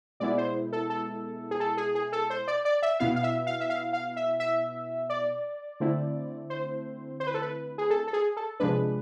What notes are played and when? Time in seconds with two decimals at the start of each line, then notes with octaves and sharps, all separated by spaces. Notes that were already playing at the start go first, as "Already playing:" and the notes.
0.20 B2 G#3 B3 E4 D5
0.38 C5
0.73 A4
0.90 A4
1.51 G#4
1.60 A4
1.77 G#4
1.95 G#4
2.12 A4
2.30 C5
2.48 D5
2.65 D5
2.82 E5
3.00 B2 B3 E4 F5
3.16 F5
3.23 E5
3.47 F5
3.61 E5
3.70 F5
3.93 F5
4.16 E5
4.40 E5
5.10 D5
5.80 D3 A3 C4 E4
6.50 C5
7.20 C5
7.27 B4
7.34 A4
7.42 B4
7.78 G#4
7.90 A4
8.07 A4
8.13 G#4
8.37 A4
8.60 C3 F3 G#3 D4 B4